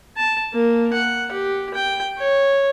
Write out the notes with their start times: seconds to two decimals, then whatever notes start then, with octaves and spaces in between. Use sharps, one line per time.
0.17 A5
0.54 A#3
0.94 F#5
1.32 G4
1.75 G5
2.19 C#5